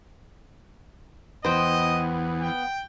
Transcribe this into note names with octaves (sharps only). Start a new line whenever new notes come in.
E2 B3 C5 D#5 G5
G5